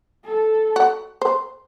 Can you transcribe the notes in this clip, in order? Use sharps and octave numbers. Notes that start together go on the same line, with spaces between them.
A4
F#4
C5